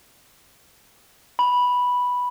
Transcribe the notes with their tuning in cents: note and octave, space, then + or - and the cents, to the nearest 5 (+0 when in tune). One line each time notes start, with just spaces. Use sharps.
B5 -5